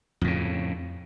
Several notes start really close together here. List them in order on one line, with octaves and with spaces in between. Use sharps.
F2 A2 C#3